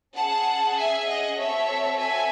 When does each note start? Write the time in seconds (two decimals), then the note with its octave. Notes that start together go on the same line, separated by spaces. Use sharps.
0.15 C#4 G#4 F#5 A5
0.76 E5 G#5
1.07 D#5 F#5
1.37 C4 F#4 A4 C#5 E5
1.98 E5 G#5